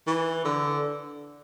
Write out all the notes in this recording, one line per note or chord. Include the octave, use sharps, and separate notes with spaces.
E3
D3